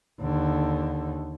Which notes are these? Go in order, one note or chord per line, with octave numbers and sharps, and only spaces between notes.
D#2 D3